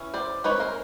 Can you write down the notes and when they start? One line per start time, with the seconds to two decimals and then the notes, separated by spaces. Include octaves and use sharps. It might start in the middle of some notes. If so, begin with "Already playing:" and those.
Already playing: E3 C#4
0.14 C5 D5
0.44 G#3 C4 D#4 B4 C#5
0.60 A#4 C5